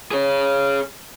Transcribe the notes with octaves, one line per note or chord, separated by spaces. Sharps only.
G#4 C#5